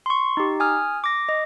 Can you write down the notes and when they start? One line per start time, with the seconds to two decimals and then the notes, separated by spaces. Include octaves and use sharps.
0.06 C6 C#6
0.37 D#4 G4
0.60 G#5 D#6 F6
1.04 D6 A#6
1.29 D#5